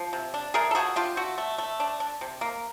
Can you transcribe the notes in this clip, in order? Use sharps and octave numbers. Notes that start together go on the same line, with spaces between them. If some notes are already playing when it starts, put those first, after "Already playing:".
Already playing: F3
C3
D4
A3 G#4 A#4
A4
F3 F#4 G#4
D4 F4 G4
A3 F#4
A3
A3
D4
D4
C3
A#3